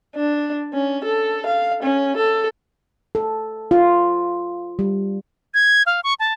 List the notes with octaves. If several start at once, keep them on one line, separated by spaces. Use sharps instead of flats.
D4
C#4
A4
F5
C#4
A4
A4
F4
G3
G#6
F5
C#6
A5